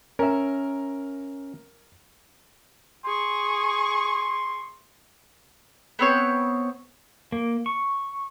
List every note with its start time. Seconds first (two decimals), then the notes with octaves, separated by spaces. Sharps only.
0.19 C#4 A#4 E5
3.05 G#4 C6 C#6
5.99 B3 C4 C#5
7.32 A#3
7.66 C#6